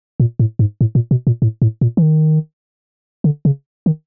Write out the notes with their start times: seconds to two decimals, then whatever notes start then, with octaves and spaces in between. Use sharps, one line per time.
0.20 A#2
0.39 A2
0.59 G#2
0.81 A2
0.95 A#2
1.11 B2
1.27 A#2
1.42 A2
1.62 A2
1.81 A#2
1.97 E3
2.02 D#3
3.24 D3
3.45 C#3
3.86 D#3